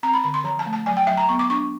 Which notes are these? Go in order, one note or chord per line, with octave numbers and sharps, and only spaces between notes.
C4 A#5
B5
D3 B5
C6
F3 A#5
A5
A3
A5
F#3 G#5
G5
F#3 E5
A#5
B3 C#6
D6
D4 C#6